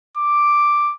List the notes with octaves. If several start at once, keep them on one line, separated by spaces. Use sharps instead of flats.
D6